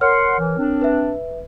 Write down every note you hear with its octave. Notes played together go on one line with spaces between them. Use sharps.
A#4 C#5 F#5 C6 F6
E3
C4 D4
B4 E5